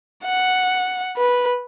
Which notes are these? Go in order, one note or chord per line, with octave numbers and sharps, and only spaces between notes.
F#5
B4